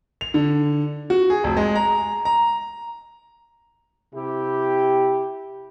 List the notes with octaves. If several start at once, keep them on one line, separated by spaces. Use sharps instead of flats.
F7
D3
F#4
G#4
F1
G#3
A#5
A#5
C3 E4 G4